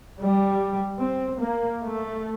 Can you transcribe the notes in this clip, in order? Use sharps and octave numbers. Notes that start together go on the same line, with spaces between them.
G3
C4
A#3
A3